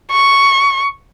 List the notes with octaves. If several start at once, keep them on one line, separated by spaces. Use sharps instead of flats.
C#6